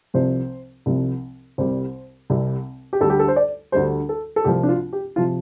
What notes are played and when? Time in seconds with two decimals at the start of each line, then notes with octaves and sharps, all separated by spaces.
0.14 C2 C3 F3 C5
0.86 C2 C3 F3
1.58 C2 C3 G3 C5
2.30 C2 C3 G3
2.93 G4
3.01 D2 D3 G3 A4
3.10 G4
3.20 A4
3.28 C5
3.36 D5
3.72 D2 D3 G3 C5
4.09 A4
4.36 A4
4.44 C2 C3 F3 G4
4.63 D4
4.68 F4
4.93 G4
5.16 C3 F3 F4